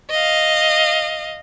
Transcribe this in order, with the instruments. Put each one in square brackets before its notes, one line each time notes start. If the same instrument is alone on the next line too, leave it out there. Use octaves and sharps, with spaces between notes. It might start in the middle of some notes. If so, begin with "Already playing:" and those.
[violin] D#5 F5